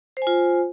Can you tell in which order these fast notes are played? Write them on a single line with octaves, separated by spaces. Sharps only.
C5 G#5 F4